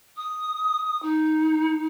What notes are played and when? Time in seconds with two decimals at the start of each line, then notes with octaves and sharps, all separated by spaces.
0.17 D#6
1.02 D#4